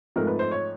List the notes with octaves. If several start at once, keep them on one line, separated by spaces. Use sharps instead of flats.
G#2 F3 A3 C4 A#4
B4
C5
C#5